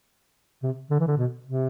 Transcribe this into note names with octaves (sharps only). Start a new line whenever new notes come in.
C3
D3
E3
D3
B2
C3